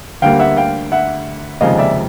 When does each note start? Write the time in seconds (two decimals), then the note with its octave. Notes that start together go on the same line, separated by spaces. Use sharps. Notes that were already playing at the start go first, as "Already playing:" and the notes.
0.22 D2 D3 G3 A#3 F5 G5
0.40 E5 F#5
0.57 F5 G5
0.92 E5 F#5
1.61 F1 D#2 C#3 F3 G#3 D#5 F5
1.78 D5 E5